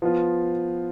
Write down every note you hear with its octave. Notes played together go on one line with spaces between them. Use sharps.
F3 B3 F4